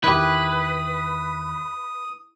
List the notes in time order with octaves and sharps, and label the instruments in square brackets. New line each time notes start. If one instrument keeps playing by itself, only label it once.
[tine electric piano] E2 D#3 [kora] E4 G4 [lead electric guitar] B4 [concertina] D#6